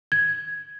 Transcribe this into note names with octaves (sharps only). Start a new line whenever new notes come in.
G#6